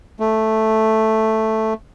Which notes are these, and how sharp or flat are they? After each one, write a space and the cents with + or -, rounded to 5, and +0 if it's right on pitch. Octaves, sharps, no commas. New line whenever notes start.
A3 +0